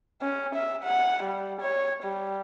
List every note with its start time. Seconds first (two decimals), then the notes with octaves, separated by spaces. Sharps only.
0.22 C#4
0.55 E5
0.84 F#5
1.23 G3
1.61 C#5
2.03 G3